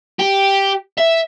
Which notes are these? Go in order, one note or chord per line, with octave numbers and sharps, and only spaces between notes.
G4
E5